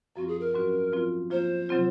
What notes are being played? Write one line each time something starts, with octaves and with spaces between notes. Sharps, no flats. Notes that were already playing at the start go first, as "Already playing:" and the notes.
F#2 F3 C4 F4 F#4
G#4
A#4
G#2 F#3 C#4 F#4
F3 C4 F4
F3 A#3 F4 C5
C3 F#3 C4 F4